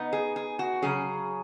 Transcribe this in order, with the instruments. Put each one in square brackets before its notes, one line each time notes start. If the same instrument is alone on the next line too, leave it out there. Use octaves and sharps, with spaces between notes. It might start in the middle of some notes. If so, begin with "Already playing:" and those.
Already playing: [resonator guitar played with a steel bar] C#3 B3 D#4
G#4
G#4
F#4
C#3 F#3 C#4 G#4